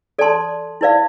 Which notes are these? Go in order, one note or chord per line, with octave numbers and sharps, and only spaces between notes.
A4 D5 A5 C6
E4 B4 D5 F5